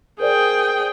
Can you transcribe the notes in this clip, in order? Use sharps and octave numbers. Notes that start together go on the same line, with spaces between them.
G#4 A#4 C5 D5 G5